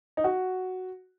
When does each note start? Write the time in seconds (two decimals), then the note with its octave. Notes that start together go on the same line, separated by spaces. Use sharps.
0.17 D#4
0.24 F#4